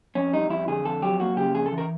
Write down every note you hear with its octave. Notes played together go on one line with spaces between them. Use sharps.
F2 C#4
G3 D#4
F2 E4
D3 G#4
F2 A4
F#3 G4
A#3 F#4
C#3 G4
F2 G#4
A4
E3
A#4